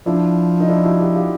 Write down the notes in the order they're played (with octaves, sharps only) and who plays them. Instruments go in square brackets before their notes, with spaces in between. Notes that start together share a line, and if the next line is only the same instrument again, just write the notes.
[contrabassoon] F3 [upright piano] D4 E4
[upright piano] D#4
D4 E4
E4 F#4
F4 G4
F4 G4